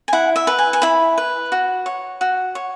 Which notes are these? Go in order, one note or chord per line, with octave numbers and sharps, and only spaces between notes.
G#5
E4 F#5
E5
B4
G#5
G#5
E4 B5
B4
F#4
C#5
F#4
C#5